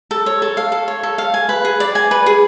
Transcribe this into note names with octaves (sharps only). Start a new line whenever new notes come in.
A4
C#5
A4
F5
A4
C#5
A4
F5
G#5
B4
G#4
D5
G#5
B4
G#4